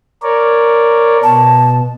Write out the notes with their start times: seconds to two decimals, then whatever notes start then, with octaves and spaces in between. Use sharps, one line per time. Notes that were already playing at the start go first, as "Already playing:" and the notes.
0.23 A#4 C#5 D5
1.23 B2 A5